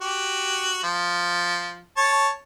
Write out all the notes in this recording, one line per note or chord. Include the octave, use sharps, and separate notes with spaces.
F#4 G4
F3
C#5 A5